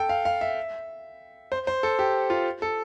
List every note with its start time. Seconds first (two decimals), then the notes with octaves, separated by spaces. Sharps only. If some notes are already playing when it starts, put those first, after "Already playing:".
Already playing: A4 G5
0.09 F5
0.25 F5
0.41 E5
1.52 C5
1.67 C5
1.83 A4
1.99 G4
2.30 F4
2.62 A4